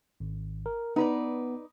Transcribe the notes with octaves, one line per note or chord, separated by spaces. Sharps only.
G#1
A#4
B3 D#4 B4 D5